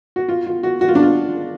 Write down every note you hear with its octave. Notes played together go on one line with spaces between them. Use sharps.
F#4
F4
F4
F#4
F#4
F4
D4
F4